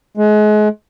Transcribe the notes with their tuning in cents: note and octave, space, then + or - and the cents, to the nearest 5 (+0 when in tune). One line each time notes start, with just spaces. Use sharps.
G#3 +30